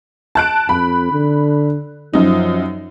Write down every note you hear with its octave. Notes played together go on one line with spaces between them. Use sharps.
A5 F#6 D7
F2 B5
D3
F#2 F3 D#4